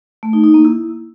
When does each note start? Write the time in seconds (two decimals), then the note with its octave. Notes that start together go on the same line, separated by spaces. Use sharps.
0.23 A3
0.33 D#4
0.44 D#4
0.54 A#3
0.65 E4